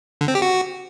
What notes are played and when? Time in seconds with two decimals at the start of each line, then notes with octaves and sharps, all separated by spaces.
0.21 D3
0.28 C4
0.35 G4
0.42 F#4